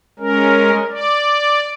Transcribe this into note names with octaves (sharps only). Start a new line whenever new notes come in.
G#3 C#4 A#4
D5